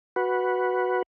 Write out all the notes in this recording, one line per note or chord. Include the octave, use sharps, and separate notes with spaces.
F#4 B4